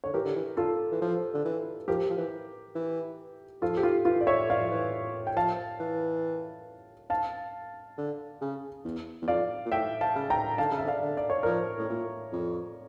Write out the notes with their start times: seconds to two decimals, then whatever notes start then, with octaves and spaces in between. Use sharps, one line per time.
0.04 D3 C#5
0.14 E3 G4 A#4
0.25 D3
0.36 E3
0.57 D3 F4 A4
0.92 E3
1.02 F3
1.34 D3
1.45 E3
1.88 F3 G4 A#4
2.09 F3
2.18 E3
2.75 E3
3.62 F3 F4 A4
3.77 G4
3.83 F4
4.05 E3 F4
4.21 D5
4.27 C#5 E5
4.49 E3 D5 F5
4.60 F3
4.71 E3
5.27 G5
5.36 F3 F5 A5
5.80 E3
7.10 F5 A5
7.98 D3
8.41 C#3
8.85 E2
9.22 E2
9.28 F2 D5 F5
9.65 A#2
9.71 A2 E5 G5
10.01 F5 A5
10.15 C#3
10.30 G5 A#5
10.58 D3 F5 A5
10.71 C#3
10.78 E5
10.85 D3
10.87 D5 F5
11.02 D3
11.17 D5
11.30 C#5
11.43 F3 A#4 D5
11.78 A2
11.89 A#2
12.32 F2